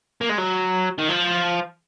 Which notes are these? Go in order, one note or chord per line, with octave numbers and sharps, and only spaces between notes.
A#3
G#3
F#3
D#3
F3